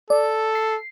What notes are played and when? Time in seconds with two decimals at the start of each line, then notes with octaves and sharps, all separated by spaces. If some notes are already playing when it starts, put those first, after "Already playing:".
0.10 A4 D5
0.55 C7